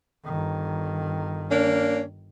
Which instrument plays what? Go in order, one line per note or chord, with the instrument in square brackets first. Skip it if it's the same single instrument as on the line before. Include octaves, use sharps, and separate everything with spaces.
[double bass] G1 D#3
[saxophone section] A#3 C#4 D4